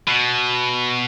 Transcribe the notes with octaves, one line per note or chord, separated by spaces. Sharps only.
B2